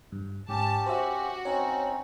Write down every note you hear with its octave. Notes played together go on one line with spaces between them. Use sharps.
G2
G#2 C#4 G4 A5
F#4 C5 E5
C4 C#4 D#4 C#5